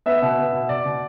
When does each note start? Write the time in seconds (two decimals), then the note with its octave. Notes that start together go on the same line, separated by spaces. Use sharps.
0.06 B3 E5
0.22 B2
0.38 B3
0.53 B2
0.69 B2 D5
0.85 B2